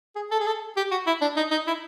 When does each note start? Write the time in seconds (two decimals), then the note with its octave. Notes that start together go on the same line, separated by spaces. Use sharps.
0.16 G#4
0.31 A4
0.40 G#4
0.46 A4
0.77 G4
0.91 F#4
1.07 E4
1.22 D4
1.37 D#4
1.51 D#4
1.67 E4